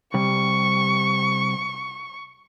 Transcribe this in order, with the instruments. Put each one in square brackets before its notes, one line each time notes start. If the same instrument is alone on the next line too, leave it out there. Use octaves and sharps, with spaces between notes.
[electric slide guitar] C3 G3 [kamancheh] C#6